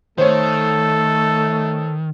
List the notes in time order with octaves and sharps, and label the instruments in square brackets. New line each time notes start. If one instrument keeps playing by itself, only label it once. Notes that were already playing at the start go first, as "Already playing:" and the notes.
[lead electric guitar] D#3 [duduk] A3 [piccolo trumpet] A4 [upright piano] C5 C#5